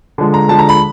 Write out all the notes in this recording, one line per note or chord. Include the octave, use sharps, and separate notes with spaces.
D3 F3 G#3
A#5
D3 F3 G#3 A5
A#5
B5